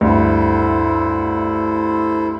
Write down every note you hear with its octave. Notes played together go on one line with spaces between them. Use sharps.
D2 G2 E4 A4 C5